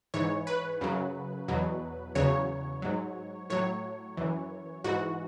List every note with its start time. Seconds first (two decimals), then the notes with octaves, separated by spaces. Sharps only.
0.14 G#2 E3 C#5
0.47 B4
0.81 F#2 C#3 F#3
1.48 E2 B2 F#3
2.15 E2 C#3 F#3 C#5
2.82 G#2 F#3
3.50 A2 F#3 C#5
4.17 F#2 E3
4.84 G#2 E3 F#4